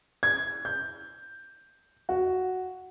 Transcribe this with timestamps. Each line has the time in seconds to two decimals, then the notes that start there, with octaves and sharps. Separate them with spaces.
0.23 G#6
0.65 G6
2.09 F#4